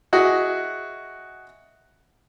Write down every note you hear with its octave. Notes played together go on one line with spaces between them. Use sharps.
E4 F#4 G#4 D#5